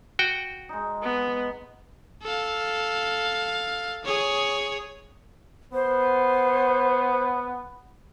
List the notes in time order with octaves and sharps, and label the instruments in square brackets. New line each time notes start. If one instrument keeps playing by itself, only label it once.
[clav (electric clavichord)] F#4 G5
[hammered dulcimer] G#3 D#4
[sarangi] B3
[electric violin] A4 F5
G#4 C#5
[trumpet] B3 [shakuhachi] C5